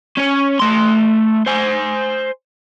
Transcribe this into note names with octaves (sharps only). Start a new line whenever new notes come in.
C#4 C#5
A3 C6
C5 G#5